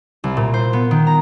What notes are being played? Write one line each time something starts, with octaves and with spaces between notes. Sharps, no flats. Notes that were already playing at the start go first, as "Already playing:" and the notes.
C2
A#2
C5
B3
D#3
A#5